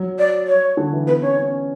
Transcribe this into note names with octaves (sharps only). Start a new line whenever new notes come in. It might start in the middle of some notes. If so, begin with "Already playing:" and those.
Already playing: F#3
D5
C#5
D3
E3
B3 B4
C#4 C#5
C#4